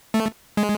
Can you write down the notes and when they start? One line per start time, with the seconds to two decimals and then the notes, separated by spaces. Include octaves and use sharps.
0.14 A3
0.57 G#3